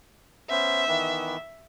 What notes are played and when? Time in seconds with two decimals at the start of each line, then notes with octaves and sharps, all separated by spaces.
0.50 B3 C#4 C5 E5
0.88 D#3 E3 B3